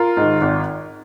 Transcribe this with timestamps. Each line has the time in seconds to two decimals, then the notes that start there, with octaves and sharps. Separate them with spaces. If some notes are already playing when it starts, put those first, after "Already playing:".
Already playing: F4 A#4
0.17 G#2 D#3
0.41 G#1